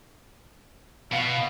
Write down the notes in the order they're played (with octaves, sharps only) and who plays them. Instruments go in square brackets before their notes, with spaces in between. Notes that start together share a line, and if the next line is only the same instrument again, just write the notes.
[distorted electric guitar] B2 [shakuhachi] F5